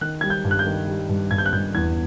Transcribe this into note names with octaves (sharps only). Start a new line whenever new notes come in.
D#3 F#6
G3 G#6
G6
G2
F#6
G6
D#3
G3
G2
G2 G#6
G6
F#6
G2 G6
E2 G#6